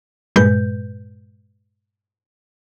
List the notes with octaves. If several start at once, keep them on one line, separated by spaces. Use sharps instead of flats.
G2 A#2 G#3 B4 G6